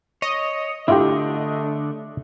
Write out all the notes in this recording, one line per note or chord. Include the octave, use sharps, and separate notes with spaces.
C#5 D#5
D3 A3 D4 E4 F4 G4